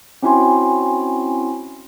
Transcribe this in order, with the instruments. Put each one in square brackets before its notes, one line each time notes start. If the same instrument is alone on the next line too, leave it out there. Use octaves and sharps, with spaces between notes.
[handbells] C4 C#4 E4 F#4 G#5 C6